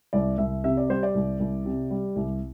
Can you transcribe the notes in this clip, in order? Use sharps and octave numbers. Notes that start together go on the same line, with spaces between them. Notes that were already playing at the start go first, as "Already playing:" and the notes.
C2 D5
C2 E5
C3 E5
D5
G3 C5
D5
C2
C2
C3
G3
C2